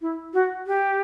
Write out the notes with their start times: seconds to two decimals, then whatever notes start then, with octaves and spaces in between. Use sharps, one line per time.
0.01 E4
0.33 F#4
0.67 G4